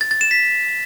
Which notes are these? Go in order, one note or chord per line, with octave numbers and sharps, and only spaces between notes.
A6
A6
E7
B6